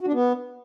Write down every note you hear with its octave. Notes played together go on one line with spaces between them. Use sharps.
F#4
D4
B3